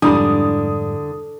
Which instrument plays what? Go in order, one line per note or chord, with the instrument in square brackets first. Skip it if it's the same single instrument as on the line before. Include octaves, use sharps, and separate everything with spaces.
[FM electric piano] F2 G#2 G3 [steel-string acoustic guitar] D3 [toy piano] D4 E4 B5 [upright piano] D#6